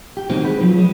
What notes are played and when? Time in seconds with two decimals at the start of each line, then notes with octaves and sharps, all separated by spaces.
0.17 G4
0.30 D#3 G#3 C4 F#4
0.44 B4
0.61 F3 F#3
0.78 G#3